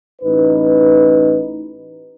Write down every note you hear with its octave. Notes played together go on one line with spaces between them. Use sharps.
A1 D#4 B4